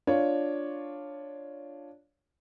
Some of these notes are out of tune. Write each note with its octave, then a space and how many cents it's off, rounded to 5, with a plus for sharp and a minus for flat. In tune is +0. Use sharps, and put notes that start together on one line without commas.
D4 +0 F4 +0 C#5 +0